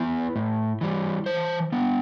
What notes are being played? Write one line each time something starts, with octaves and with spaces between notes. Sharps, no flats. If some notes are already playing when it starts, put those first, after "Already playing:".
Already playing: B3 E4 B4
A2
E3 G3
E3 C5
B3 D4